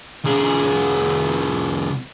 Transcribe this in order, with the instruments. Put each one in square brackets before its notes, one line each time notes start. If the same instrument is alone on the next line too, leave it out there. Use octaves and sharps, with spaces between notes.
[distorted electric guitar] C2 G#4